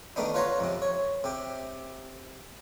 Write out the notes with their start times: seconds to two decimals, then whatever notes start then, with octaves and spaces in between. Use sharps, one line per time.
0.16 D#3 A3 B3 D4 D#4
0.34 F4 B4 C#5 F#5 A#5 C6
0.60 F2 C3
0.82 C#5
1.24 C3 G4